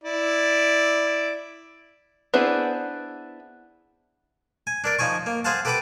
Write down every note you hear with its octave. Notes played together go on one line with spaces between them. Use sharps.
E4 D5
B3 D4 E4 G#4 C5
G#5
D4 A#4 D5
F3 D#4 G#5 C#6
A#3
G#4 C5 F5 F#5 A5
G4 A4 B4 F#5 B5 D6